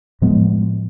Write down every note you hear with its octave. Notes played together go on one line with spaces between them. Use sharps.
A2 F3 G#3 B3